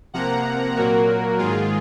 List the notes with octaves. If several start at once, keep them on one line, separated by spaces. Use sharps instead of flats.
C3 F3 A#3 F#5 A#5
A#2 F#3 A#3 F#4 A#4
G#2 D#3 G#3 F4 G#4